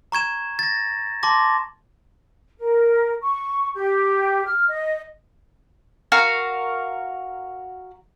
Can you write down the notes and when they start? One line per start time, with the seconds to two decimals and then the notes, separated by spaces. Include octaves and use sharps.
0.12 A#5 C#6 G#6 E7
0.59 A6 A#6
1.23 A5 C6 D6 A#6
2.58 A#4
3.23 C#6
3.74 G4
4.45 F6
4.68 D#5
6.12 F#4 A#4 F5